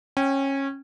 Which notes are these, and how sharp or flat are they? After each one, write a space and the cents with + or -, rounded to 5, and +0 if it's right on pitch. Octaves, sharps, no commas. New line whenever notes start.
C#4 -20 G5 +0